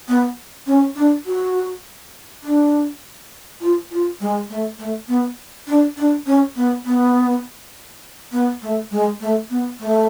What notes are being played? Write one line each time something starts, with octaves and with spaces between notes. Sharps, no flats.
B3
C#4
D4
F#4
D4
F4
F4
G#3
A3
A3
B3
D4
D4
C#4
B3
B3
B3
A3
G#3
A3
B3
A3